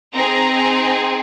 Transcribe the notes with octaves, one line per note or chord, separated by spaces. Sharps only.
C4 D#4 G#4 A#5